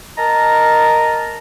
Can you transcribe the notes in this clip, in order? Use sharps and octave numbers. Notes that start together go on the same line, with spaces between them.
A#4 D#5 A5 A#5